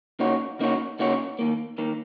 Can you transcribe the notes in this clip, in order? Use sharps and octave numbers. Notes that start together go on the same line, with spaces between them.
C#3 A#3 D#4 F#4 C#5
C#3 A#3 D#4 F#4 C#5
C#3 A#3 D#4 F#4 C#5
D#2 D#3 A#3
D#2 D#3 A#3